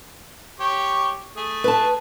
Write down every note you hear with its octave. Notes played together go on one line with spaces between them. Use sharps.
G4 C#5
A3 G#4
B4 A5